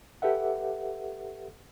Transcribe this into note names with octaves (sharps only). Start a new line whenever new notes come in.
G4 A4 B4 E5 F#5